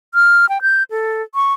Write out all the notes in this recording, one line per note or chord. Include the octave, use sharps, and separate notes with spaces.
F6
G5
G6
A4
C#6